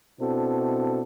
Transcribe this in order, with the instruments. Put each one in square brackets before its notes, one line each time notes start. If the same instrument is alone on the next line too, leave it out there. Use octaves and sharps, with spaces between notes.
[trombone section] B2 C4 D4 E4 F#4 A4